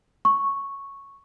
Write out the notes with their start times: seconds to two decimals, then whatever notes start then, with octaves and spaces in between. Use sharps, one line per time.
0.25 C#6